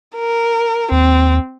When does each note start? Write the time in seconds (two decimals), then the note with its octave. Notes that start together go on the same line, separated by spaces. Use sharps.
0.16 A#4
0.92 D#2 C4